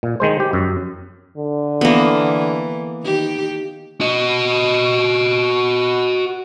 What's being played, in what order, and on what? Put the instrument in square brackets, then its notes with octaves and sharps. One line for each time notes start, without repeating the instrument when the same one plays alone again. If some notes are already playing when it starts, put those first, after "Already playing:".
[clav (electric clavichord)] A#2
D#3 G#3 C5
G4
F#2
[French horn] D3
[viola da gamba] E3 [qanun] A#3 B3
[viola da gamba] D#3 G4
[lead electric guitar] F#4 D#5